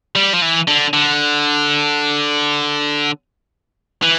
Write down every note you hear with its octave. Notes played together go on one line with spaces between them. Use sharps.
G3
F3
E3
D3
D3
E3